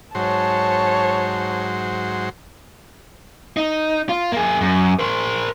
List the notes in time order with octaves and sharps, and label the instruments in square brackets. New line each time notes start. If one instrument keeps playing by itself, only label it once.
[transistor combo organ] G#2 F#3 C5 [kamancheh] C#5 A5
[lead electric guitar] D#4
F4
A#3 G#4
F#2
A#4 C5